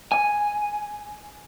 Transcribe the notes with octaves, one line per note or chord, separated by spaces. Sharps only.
G#5